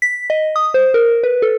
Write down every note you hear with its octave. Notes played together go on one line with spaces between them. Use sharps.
B6
D#5
D#6
C5
A#4
B4
A4